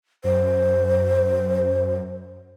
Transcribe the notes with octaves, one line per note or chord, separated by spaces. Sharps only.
F#2 C5